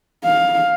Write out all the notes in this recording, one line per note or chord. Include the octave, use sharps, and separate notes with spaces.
F5